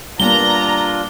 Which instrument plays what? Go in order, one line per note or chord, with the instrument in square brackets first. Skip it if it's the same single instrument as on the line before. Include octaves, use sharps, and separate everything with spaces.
[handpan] G3 A#3 B3 [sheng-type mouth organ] D4 F4 [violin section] A#5 [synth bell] G7